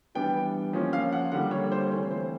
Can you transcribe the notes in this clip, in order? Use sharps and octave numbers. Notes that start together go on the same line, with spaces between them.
E3 G3 B3 D4 G5
F3 A#3 C#4
F5
F#5
D3 G3 A#3 F#5
C#5
C5
E3 A3 C4 C#5
C5